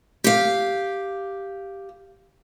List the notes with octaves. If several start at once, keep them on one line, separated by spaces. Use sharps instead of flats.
G4 F5